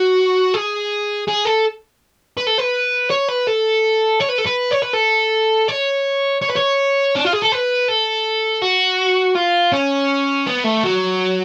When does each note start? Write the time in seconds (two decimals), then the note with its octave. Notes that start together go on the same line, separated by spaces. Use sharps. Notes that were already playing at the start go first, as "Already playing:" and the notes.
Already playing: F#4
0.54 G#4
1.27 G#4
1.45 A4
2.38 B4
2.47 A4
2.58 B4
3.11 C#5
3.29 B4
3.47 A4
4.21 C#5
4.30 B4
4.39 A4
4.47 B4
4.72 C#5
4.83 B4
4.94 A4
5.68 C#5
6.42 C#5
6.49 B4
6.56 C#5
7.16 D4
7.25 F4
7.33 G#4
7.42 A4
7.52 B4
7.88 A4
8.62 F#4
9.35 F4
9.72 C#4
10.46 B3
10.64 A3
10.83 F#3